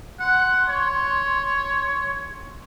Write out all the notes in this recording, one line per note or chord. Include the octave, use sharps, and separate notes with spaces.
F#5 C6
C#5